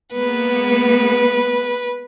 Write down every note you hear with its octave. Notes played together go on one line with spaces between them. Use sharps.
G#3 A#3 B3 B4